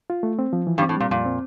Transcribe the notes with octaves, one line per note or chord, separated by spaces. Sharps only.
F4
A3
C4
F3
E3
G2 G3
C4
A2
A#2 G3
F2 A#2
C4